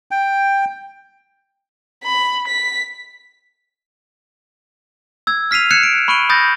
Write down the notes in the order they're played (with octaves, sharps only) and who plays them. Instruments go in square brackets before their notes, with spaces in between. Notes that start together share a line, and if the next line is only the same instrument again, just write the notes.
[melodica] G5
[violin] B5
B6
[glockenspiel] E6 G#6
F6 B6 C7 D#7 F7
F#6 G#6 C7 C#7 E7
D7
B5 C#6 F#6 D7 D#7 G7
B5 D#6 G6 A6 A#6